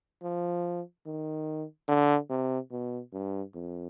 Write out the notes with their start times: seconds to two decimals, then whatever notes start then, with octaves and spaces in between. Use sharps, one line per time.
0.23 F3
1.06 D#3
1.89 D3
2.30 C3
2.71 B2
3.13 G2
3.55 F2